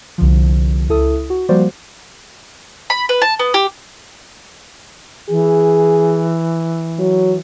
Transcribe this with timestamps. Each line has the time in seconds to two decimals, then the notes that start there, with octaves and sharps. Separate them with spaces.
0.18 C2 D3 F3
0.89 C#2 E4 A4 D#6
1.30 F#4
1.49 F3 G3 A#3 F#4 C5 D5
2.90 B5
3.09 B4
3.22 A5
3.40 B3
3.54 G4
5.30 E3 G#4
6.99 F#3